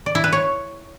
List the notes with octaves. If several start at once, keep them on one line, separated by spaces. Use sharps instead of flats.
D5
E4
B4
C#5